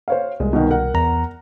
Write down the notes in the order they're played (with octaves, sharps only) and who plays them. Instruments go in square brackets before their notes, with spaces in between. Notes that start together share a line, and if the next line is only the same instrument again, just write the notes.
[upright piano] C5 C#5 F5
[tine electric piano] C2 [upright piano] G#3
[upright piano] B2 D#3
A#4 F#5
[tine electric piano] E2 A#5